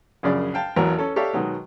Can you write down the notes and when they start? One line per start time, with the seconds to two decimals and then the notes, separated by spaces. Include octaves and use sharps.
0.23 A#1 F#2 C#3 G#4 D5
0.54 F5 G5 A5
0.76 A1 E2 F#3 A#3 C#5 A#5
0.98 C#4 A4
1.16 G4 A4 C#5 D5 E5 F5
1.33 B2 D#3 F#3 G#3